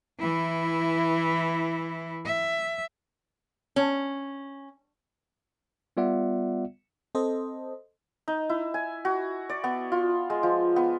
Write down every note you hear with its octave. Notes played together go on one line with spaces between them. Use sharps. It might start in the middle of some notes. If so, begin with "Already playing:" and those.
E3 E4
E5
C#4
G3 B3 F4 D5 E5 F#5
C4 A4 C5 D#5
D#4
E4
G#5
F#4
D5
B3
F4
G#3
F3
B3